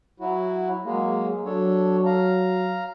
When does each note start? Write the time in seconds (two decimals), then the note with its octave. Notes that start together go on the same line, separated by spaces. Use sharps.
0.20 F#3 E4 F#4
0.84 F#3 G#3 A#3
1.45 F#3 D4 A4 C#5
2.05 F5 A#5